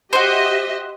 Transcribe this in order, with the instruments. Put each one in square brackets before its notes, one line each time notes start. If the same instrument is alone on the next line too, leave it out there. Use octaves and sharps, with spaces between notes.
[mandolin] F#4 C5 [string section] G4 D#5 E5